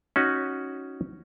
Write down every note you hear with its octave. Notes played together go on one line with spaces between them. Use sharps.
C#4 D#4 F#4